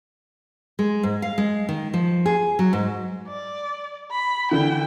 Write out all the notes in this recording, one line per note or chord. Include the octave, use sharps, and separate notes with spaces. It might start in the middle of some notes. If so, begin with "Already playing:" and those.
G#3
G#2
F5
G#3
D#3
F3
G#4
F#3
G#2
D5
B5
D3 E3 G5